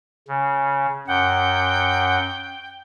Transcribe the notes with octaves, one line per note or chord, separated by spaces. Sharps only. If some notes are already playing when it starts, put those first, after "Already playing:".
C#3
F#2 F#5 G5